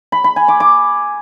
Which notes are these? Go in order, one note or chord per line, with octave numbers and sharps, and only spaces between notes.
B5
B5
G#5
D6
D6